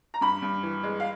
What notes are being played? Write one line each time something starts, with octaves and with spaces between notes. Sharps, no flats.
A#5
G2 B5
G2
E3
G#3
F5